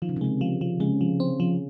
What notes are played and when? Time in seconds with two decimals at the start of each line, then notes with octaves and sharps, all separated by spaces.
0.02 D#3 F3
0.09 C#3
0.16 C3
0.21 C#3 G#3
0.41 F3
0.61 F3
0.80 C#3 G#3
1.01 F3
1.20 C4
1.40 F3